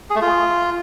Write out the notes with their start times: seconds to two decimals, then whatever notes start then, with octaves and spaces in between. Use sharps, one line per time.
0.10 G#4
0.16 A3
0.21 F4